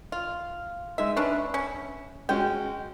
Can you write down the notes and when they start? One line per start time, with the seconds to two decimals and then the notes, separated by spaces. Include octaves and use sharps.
0.12 F4
0.98 G#3 D#4 E5
1.17 C#4 D4 B4 E5
1.54 C#4
2.29 G#3 C#4 F#4 G5